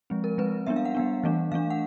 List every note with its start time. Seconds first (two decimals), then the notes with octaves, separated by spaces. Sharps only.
0.10 F3 G#3 C4
0.24 A#4
0.38 F3 G#3 C4 B4
0.66 G3 B3 D4 E5
0.76 F5
0.85 F#5
0.95 G3 B3 D4
1.23 E3 A3 D4
1.52 E3 A3 D4 F5
1.70 F#5